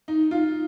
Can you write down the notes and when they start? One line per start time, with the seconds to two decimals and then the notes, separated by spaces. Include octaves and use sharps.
0.08 D#4
0.31 F4